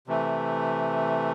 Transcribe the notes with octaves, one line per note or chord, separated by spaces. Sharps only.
C3 E3 A3